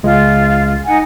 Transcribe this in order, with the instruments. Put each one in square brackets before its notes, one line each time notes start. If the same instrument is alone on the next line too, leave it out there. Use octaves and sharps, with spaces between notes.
[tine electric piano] C#2 G#3 [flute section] F4
[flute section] D#4 F#5 G#5